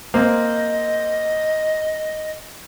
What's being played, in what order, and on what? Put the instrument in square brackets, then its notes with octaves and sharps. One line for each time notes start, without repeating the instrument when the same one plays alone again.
[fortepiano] A#3 C4 [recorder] D#5